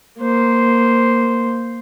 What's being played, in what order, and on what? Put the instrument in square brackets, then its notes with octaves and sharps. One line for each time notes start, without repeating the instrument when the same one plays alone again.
[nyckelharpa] A#3 C5